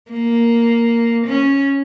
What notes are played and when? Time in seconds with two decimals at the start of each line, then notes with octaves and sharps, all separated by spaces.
0.11 A#3
1.27 C#4